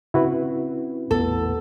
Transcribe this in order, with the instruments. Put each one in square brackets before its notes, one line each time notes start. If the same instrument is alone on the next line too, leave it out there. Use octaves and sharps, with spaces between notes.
[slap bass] C#3 C4 [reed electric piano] E4 F#4 B4
[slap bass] A1 E2 A#2 [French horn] B3 [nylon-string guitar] A4